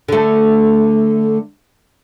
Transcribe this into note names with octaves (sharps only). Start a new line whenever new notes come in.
D3 A3